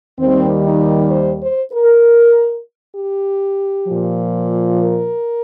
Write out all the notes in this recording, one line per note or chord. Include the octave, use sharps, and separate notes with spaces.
D#2 D#3 G3 C4
D#4
C5
C5
A#4
G4
A#2 F3
A#4